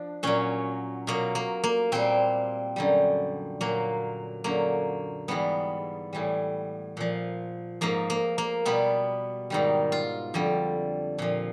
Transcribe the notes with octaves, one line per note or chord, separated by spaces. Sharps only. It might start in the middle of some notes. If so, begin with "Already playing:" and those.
Already playing: F3 D4
A#2 F#3 C#4
B2 F#3 A#3
A#3
A#3
A#2 G3 C4
F#2 D3 G3
A#2 F#3 A#3
F#2 D3 F#3 A#3
G#2 E3 G3 B3
A2 E3 G3
A#2 F3
G#2 F3 A#3
A#3
A#3
B2 G3 B3
G#2 D#3 G3
F4
F2 D3 G3
A#2 F3